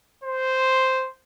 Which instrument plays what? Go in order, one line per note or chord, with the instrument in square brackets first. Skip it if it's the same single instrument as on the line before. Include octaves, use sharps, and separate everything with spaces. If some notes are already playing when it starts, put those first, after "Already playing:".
[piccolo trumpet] C5